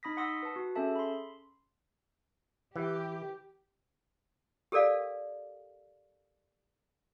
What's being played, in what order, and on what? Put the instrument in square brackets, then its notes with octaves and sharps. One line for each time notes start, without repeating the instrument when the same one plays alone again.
[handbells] D#4 B5 D#6 A#6 B6
F#5 C6 D#6 E6 A#6 B6
B4 A5
F#4
C#4 G#4 A4 E5 A5
B5 C6
[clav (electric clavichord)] E3 [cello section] G4
[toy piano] G4 A4 A#4 D5 F5